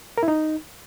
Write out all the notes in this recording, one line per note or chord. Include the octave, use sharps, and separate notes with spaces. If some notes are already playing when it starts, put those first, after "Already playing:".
A#4
E4
D#4